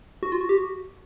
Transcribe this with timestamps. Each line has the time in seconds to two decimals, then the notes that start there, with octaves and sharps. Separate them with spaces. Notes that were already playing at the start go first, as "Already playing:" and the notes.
0.23 F#4
0.32 F4
0.41 F#4
0.49 G4
0.58 F#4